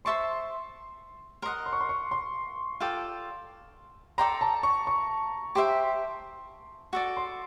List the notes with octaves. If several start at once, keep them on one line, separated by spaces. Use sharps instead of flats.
C5 E5 A5 C6 C#6
A#4 D#5 F#5 C6
C6
C#6
C6
C#6
C6
F4 A4 D5 G5
A4 D5 G5 A#5 C6
A5
C#6
C#6
G4 C5 E5 G5 C6
F#4 A4 D5
C6